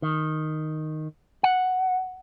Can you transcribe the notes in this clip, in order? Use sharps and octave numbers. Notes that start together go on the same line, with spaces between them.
D#3
F#5